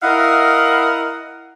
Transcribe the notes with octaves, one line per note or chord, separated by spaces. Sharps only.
E4 A#4 D#5 F5 F#5